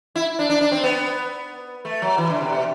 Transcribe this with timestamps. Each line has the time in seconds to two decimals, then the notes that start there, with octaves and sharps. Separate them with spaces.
0.15 E4
0.39 D4
0.50 D4
0.61 D4
0.72 C4
0.83 B3
1.85 A3
2.02 F#3
2.18 E3
2.30 D3
2.41 C3
2.53 B2